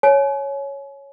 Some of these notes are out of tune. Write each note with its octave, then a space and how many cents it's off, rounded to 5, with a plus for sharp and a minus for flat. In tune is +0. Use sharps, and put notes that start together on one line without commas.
C#5 +0 G#5 +35